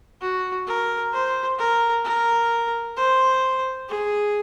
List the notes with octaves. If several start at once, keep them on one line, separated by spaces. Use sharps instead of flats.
F#4
A#4
C5
A#4
A#4
C5
G#4